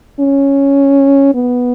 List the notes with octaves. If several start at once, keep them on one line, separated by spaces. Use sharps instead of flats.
C#4
B3